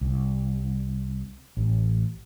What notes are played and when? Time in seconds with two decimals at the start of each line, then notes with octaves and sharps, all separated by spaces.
0.01 C2
1.57 A1